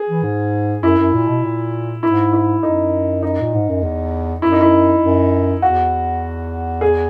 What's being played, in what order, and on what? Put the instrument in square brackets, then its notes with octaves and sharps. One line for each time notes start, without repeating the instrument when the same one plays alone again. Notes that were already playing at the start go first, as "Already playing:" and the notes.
Already playing: [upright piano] G#4
[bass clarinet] E3
G#2
[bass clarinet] F#2 [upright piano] E4
[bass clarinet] F#2
A#2
B2
A#2
[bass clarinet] G#2 [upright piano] E4
[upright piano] E4
[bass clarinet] F#2 [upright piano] D#4
[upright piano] D#4
[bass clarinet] A#2
G#2
F#2
E2
[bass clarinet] F#2 [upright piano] E4
[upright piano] D#4
E4
[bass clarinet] F#2
[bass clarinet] E2 [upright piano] F#4
[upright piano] G#4